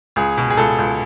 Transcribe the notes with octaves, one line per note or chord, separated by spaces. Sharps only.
C#2 G#4
B2
G#4
C#2 A4
C#2